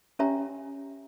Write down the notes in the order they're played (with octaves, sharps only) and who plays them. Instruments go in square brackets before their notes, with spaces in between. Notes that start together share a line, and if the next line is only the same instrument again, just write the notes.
[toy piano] C#4 G4 C#5 E5 G#5 A#5